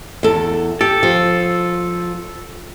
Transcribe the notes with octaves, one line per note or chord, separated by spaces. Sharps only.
E2 A4
G4 A4
F3